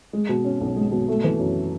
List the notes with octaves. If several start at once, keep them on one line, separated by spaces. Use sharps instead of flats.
G#3
B2
C#4
B1
G#3
B2
A3
E3
F#2